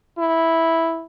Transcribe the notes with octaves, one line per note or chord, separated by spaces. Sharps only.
E4